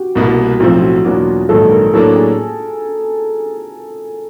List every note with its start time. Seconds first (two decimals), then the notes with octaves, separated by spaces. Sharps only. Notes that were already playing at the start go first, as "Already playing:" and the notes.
Already playing: F#4 G4
0.15 C2 B2 G3 A#3
0.60 B1 A2 F3 A3 C4 F4
0.82 F#4
1.05 E2 B2 F#3 A#3 D4 F#4
1.49 A#1 G#2 D#3 F#3 A4
1.72 A#4
1.93 A2 F#3 A#3 D4 A4
2.16 G#4